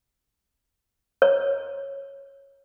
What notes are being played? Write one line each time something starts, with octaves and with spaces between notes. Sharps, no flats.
C#5